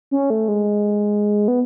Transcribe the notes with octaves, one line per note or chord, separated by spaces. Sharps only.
C#4
A3
G#3
B3